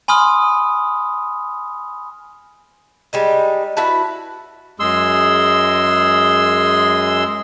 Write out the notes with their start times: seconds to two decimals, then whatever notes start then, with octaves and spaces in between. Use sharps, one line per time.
0.08 G#5 B5 C6 D#6 F6
3.13 G3 G#3 D#4
3.77 E4 F#4 B4 A5
4.80 F#2 G#3 G#4 C6 E6